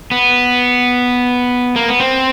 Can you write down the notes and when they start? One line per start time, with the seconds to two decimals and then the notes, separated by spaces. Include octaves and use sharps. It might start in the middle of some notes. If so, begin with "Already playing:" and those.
0.12 B3
1.76 A#3
1.88 B3
2.00 C4